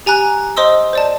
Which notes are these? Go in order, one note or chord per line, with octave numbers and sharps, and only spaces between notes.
G4 G#5 A#5 F#6
C5 D#5 C6 D#6 E6
C5 D5 A5